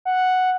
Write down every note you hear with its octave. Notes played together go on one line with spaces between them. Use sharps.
F#5